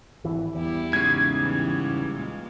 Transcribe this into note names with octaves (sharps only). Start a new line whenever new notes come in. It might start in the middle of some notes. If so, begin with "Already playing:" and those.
G#1 E3
E2 G3 E4 G4
G#2 C#3 G#6
A2 E3 G3
A#2 G#3 A#3